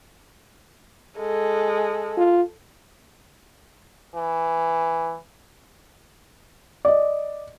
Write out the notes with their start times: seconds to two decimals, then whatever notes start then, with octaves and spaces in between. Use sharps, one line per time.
1.18 G#3 A4
2.17 F4
4.15 E3
6.85 D5 D#5